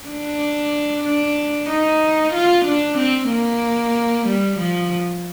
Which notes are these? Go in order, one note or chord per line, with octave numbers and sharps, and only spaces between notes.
D4
D4
D#4
F4
D4
C4
A#3
G3
F3